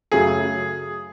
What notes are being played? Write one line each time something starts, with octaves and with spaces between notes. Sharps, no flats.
F#2 C#3 F#3 A3 G#4